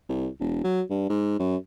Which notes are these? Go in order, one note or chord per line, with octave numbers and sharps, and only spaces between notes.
C2
E1
F#3
G2
G#2
F#2